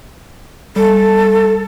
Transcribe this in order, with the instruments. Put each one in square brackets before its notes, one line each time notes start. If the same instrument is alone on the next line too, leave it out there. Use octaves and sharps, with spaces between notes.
[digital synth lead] G3 [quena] A4